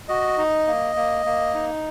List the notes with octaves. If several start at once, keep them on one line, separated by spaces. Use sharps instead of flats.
F#4 D#5
D#4
A#3
A#3
A#3
D#4